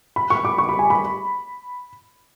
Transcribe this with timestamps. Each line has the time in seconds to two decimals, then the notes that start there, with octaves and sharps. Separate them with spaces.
0.16 B5
0.30 C#6
0.45 D6
0.58 C#6
0.69 B5
0.79 G#5
0.90 B5